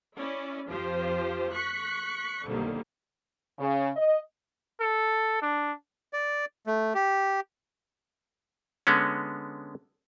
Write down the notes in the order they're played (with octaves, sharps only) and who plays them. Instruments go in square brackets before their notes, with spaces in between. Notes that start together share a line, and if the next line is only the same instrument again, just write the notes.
[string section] C#4 E4 D5
F2 F3 F4 G4 C5
C#6 F#6 B6 C#7
B1 F2 D3 D#3 G3 A#3
[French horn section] C#3
D#5
[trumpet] A4
D4
[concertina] D5
A3
G4
[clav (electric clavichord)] D3 G#3 B3 C#4